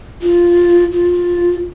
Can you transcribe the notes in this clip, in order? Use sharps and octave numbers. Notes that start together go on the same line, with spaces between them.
F4
F4